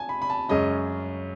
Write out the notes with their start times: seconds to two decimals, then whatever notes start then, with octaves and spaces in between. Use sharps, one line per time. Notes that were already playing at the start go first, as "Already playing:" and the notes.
Already playing: G#5 A5
0.09 B5
0.22 B5
0.30 A5
0.49 F#2 C#3 G#3 C#4 D#5